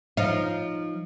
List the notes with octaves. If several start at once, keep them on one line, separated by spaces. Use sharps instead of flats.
F3 D#4 F4